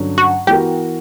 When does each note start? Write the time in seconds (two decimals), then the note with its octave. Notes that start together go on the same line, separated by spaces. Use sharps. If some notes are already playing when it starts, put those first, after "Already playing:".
Already playing: G2 D3 F#3 C#4
0.18 F#4
0.47 E3 B3 F#4 G4 A#4